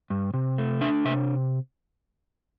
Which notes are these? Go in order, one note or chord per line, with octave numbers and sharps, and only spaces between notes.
G2
C3
A3
D4 E5
C3 E5